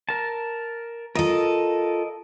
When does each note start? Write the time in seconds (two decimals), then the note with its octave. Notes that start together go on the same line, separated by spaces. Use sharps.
0.09 A#4 A5
1.15 F4 A4 A#4 D#5